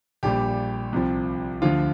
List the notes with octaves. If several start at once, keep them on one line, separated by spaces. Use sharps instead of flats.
A#1 A#2 G3 G4
C2 C3 F3
D2 D3 F3 F4